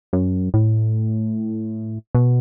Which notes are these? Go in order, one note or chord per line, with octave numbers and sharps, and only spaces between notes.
F#2
A2
B2